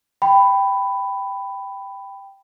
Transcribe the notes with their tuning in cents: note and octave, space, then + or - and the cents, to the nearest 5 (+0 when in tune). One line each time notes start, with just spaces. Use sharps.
G5 +0 B5 +10